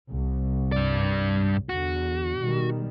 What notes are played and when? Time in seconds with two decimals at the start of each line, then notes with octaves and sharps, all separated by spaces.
0.10 C2
0.72 G2 D5
1.69 E2 D3 F#4
2.40 B2 D#3 G3